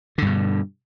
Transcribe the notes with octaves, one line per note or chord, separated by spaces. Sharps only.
G2 B2 D3